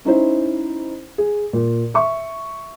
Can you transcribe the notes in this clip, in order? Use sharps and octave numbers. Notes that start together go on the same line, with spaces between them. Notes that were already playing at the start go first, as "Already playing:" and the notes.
C#4 D#4 E4 C5
G#4
A#2
E5 C#6